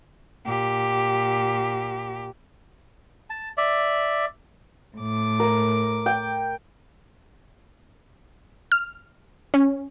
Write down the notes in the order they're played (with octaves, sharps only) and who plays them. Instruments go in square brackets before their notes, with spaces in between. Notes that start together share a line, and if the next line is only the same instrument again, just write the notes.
[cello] A#2 G4
[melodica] A5
D5 E5
[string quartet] A2 D6
[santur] A#4
G5
[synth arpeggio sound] F6
C#4